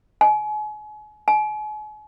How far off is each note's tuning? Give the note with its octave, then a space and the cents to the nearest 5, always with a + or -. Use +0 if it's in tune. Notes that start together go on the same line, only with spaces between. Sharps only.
G#5 +35
G#5 +40